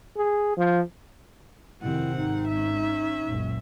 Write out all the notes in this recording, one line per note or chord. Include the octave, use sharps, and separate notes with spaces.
G#4
F3
F2 C3 D#3 C4 E4 F#5
G#1 D#4
C#4 E5
F#1 C#2 A#2